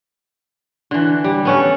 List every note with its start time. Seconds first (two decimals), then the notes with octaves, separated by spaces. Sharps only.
0.91 D3 E3
1.24 G3
1.45 B3 C#4 A4